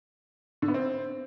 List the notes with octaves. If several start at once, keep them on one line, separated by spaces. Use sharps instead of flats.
D3
B3
C4